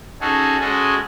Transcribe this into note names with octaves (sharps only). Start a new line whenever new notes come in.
C#4 D#4 F#4 G#4 A4
G#3 C#4 F#4 G#4 A4 D#5